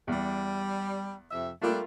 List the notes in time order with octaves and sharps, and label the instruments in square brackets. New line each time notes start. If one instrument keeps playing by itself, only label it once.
[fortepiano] E2 [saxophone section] G3
[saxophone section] F2 C3 E5
[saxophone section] G3 D4 A4 [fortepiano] A3 A#3 F4